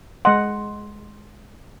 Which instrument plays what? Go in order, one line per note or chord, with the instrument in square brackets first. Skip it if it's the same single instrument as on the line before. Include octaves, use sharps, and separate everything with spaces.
[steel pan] G#3 D#5 F#5 [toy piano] C6